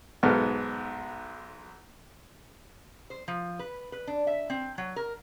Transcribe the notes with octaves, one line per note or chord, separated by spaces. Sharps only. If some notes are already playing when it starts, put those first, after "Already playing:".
B1 G#2 B3 A4 F6
C5
F3
B4
B4
D4
E5
C4
F#3
A#4